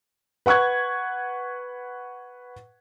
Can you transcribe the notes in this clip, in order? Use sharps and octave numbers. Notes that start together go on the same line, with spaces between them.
B4 F#5 C#6 F#6 G#6